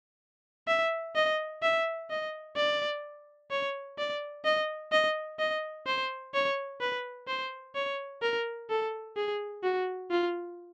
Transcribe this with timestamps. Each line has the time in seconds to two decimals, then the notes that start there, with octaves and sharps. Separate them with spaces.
0.68 E5
1.15 D#5
1.62 E5
2.10 D#5
2.56 D5
3.51 C#5
3.98 D5
4.45 D#5
4.92 D#5
5.39 D#5
5.87 C5
6.34 C#5
6.80 B4
7.28 C5
7.75 C#5
8.22 A#4
8.70 A4
9.17 G#4
9.63 F#4
10.11 F4